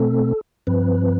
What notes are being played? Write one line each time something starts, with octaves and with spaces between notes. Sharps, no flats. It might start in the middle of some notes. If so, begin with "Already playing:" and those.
Already playing: B2 A3 C4 A4
G2 F3 C4 B4